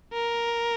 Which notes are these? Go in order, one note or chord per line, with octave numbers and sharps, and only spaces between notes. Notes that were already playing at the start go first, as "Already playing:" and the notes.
A#4